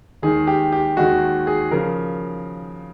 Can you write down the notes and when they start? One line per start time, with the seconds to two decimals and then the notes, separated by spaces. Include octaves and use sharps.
0.22 D#2 D#3 G#3 G#4
0.47 G4
0.72 G4
0.97 D#2 D#3 G#3 F#4
1.47 G#4
1.71 C#3 F3 A#4